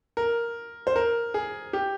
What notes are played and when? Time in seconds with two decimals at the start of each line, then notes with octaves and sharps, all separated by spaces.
0.17 A#4
0.87 C5
0.96 A#4
1.34 G#4
1.73 G4